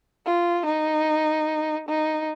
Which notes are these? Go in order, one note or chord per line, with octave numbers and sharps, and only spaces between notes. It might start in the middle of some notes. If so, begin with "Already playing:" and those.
F4
D#4
D#4